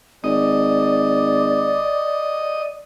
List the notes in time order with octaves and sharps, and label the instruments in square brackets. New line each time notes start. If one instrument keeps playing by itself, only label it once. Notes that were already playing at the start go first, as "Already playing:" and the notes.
[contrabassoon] G#1 [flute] D5 [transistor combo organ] D#5